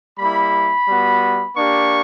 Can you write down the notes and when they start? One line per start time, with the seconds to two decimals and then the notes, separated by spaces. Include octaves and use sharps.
0.19 G3 A#3 E4 B5
0.88 G3 B3 F#4
1.57 A#3 D4 G4 C#6